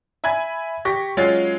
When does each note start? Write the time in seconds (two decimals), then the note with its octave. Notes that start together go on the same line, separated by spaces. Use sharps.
0.24 E5 G#5 B5 G#6
0.85 G4 C#6 A#6 B6
1.17 F#3 G#3 C#4 F4 A6